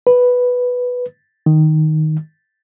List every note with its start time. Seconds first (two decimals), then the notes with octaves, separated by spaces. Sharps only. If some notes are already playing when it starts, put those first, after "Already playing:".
0.07 B4
1.46 D#3